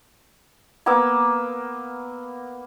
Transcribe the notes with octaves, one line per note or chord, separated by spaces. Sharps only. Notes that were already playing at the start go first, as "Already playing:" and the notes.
A#3 B3 D6 E6